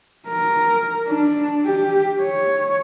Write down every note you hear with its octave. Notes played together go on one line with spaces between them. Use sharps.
A#4
D4
G4
C#5